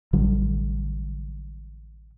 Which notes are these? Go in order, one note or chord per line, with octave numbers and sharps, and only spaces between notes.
A1 D3 F#3 G3